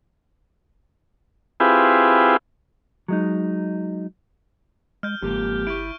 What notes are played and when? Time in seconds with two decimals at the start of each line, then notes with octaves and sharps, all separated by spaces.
1.60 C4 E4 F4 G4 G#4 B4
3.08 F#3 G#3 D#4
5.03 G#3 F6 G6
5.22 G1 F2 G#2 A#3 G4
5.67 E4 C#6 G6 D7